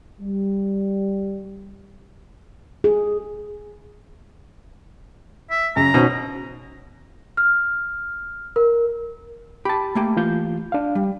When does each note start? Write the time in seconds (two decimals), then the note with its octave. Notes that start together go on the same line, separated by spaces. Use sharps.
0.21 G3
2.84 G#4
5.51 E5
5.76 F#2 C#3 A#5
5.94 B2 D#3 C#4 C5
7.37 F6
8.56 A#4
9.65 G4 A5 B5
9.95 A3 A#3 G4
10.17 E3 F4 G6
10.72 D4 F5
10.95 G3